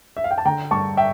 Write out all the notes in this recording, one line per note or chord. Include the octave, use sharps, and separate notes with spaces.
E5
F5
G5
A5
D3 G5 A#5
G2 A5 C#6
E5 G5